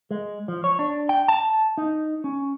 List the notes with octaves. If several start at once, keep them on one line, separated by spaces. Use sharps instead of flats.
G#3
F3
C#5
D4
G5
A5
D#4
C#4